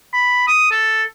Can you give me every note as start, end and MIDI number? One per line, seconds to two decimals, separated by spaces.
0.13 0.44 83
0.48 0.68 87
0.71 1.03 69